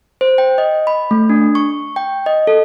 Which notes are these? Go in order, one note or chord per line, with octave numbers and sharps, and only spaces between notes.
C5
G5
D#5
B5
A3
D4
C#6
G5
D#5
A4